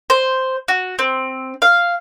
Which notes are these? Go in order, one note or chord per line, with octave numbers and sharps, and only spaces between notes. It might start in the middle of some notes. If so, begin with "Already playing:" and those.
C5
F#4
C4
F5